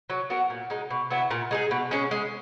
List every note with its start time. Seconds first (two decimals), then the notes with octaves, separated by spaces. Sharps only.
0.10 F#3
0.30 B3 F#4 A#4
0.50 A#2
0.70 G#3 D#4
0.91 B2
1.10 F#3 B3 E4
1.31 A#2
1.51 G#3 D#4 G#4
1.71 B2
1.91 G#3 C#4
2.11 G#3